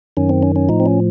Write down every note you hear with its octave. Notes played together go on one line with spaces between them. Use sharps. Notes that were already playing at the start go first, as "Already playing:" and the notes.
F#2 D#3 C#4
C4
C#4
C#4
A2 F3 D#4
C4
C#4